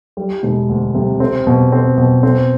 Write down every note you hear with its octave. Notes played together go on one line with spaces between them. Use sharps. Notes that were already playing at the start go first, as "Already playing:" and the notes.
G3
E1
D2
C3
C4
B2
C4
B2
C4